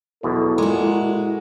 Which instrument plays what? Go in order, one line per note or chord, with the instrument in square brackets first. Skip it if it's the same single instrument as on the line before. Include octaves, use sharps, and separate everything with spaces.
[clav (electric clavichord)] B1 E2 B2 [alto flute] E4 [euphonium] A4
[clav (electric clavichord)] A#2 [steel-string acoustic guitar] G#3 F#4